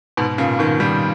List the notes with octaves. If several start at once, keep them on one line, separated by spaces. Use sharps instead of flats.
G#2 B2
A#2 C#3
B2 D#3
D#3 G3